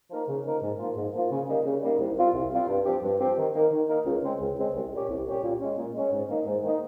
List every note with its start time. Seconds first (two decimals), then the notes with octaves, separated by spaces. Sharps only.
0.11 F3 A#3 D#4 A#4
0.28 C#3
0.45 F3 A#3 D#4 A#4
0.62 G#2
0.79 F3 A#3 F4
0.96 G#2
1.14 F3 A#3 F4
1.31 C#3
1.48 G3 A#3 D#4
1.65 C#3
1.82 G3 A#3 D#4
2.00 C2
2.16 C3 G3 C4 F4
2.34 C2
2.52 C3 G3 C4 F4
2.68 G2
2.86 F3 C4 G4
3.03 G2
3.20 F3 C4 G4
3.37 D#3
3.55 A#3 D#4 A#4
3.72 D#3
3.89 A#3 D#4 A#4
4.06 C#2
4.23 C#3 G#3 C4
4.41 C#2
4.57 C#3 G#3 C4
4.75 C2
4.92 A#2 G3 C#4 G4
5.09 C2
5.26 A#2 G3 C#4 G4
5.43 A#2
5.60 G#3 C#4
5.78 A#2
5.95 G#3 C#4
6.12 G#2
6.29 D#3 A#3 D#4
6.46 G#2
6.63 D#3 A#3 D#4